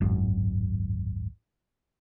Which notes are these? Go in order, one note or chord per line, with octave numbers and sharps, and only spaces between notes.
D1 G#1 F#2